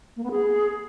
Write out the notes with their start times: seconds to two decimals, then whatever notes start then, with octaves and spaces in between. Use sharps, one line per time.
0.16 A#3
0.24 B3
0.31 G#4